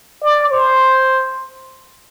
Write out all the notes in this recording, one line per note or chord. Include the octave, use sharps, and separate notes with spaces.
D5
C5